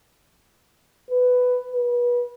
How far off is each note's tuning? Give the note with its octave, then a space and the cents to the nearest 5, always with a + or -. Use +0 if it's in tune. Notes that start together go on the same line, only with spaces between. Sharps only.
B4 +10
B4 -30